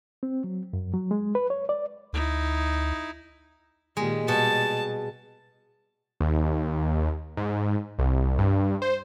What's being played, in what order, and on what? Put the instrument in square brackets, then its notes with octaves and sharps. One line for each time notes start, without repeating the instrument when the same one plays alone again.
[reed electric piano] C4
F#3
F#2
F#3
G#3
B4
C#5
D5
[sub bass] D2 [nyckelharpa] D#4 E4
[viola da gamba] A#2 D#3 G4 [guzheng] G#3
[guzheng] B2 [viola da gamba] G3 [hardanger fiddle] A5
[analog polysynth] D#2
G#2
C2
G2
C5